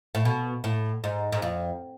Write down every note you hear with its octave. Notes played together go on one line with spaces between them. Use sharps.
A2
B2
A2
G#2
G#2
F2